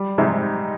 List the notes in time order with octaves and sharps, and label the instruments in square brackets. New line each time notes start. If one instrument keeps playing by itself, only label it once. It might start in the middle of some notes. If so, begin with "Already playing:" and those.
Already playing: [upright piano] G3
[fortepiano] G#2 C3 [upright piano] D#4